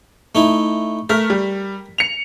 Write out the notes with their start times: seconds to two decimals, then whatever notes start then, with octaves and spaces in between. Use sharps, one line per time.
0.35 A3 D#4 E4
1.09 A3 A#4 F6 B6
1.30 G3
1.98 C#7 F7